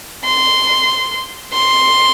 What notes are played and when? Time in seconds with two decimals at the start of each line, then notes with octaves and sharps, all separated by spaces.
0.24 C6
1.53 C6